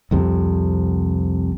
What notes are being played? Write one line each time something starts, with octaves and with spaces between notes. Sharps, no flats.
C2 F2 C3